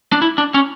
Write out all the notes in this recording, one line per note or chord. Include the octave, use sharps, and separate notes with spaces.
D4
E4
D4
C#4